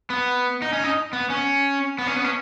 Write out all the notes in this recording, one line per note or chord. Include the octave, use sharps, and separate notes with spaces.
B3
D#4
C#4
D#4
B3
C#4
B3
C#4
B3
C#4